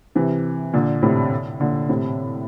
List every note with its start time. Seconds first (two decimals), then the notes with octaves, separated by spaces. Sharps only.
0.15 C3 E3
0.73 A#2 D3
1.02 A2 C3
1.60 A#2 D3
1.89 A2 C3